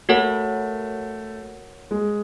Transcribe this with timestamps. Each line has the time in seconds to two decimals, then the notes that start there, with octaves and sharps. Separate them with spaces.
0.09 A3 F#4 A#4 C#5 F#5
1.91 G#3